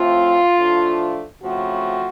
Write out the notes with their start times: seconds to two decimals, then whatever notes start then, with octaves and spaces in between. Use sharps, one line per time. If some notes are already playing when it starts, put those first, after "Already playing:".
Already playing: A2 F3 A3 C4 F4
0.57 A2 F3 A3 D4
1.42 C#3 F3 A3 C4 F#4